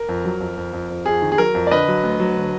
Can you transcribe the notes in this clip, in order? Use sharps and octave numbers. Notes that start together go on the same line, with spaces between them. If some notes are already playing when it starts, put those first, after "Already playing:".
Already playing: A#4
F2
F#3
F2
F2
F2
F2
F2 G#4
D#3
G#4
F#3 A#4
F2
D5
D3 B4 D#5
F#3
D2
F#3
D3